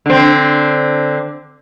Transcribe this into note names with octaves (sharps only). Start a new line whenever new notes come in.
D3 C4